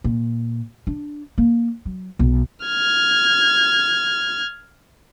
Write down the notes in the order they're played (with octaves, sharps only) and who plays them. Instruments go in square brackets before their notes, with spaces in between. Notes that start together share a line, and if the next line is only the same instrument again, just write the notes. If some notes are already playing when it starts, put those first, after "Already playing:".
[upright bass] A#2
D4
A#3
F#3
B1
[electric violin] F6 G#6